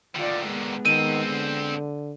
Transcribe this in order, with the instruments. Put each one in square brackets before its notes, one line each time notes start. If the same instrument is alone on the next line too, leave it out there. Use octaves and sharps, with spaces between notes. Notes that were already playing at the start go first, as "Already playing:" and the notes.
[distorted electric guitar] D3 D#3 [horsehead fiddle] F4 D5
[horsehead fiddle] G#3 B3
[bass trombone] D#3 [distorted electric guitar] C4 A4 [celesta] D#7
[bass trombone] D3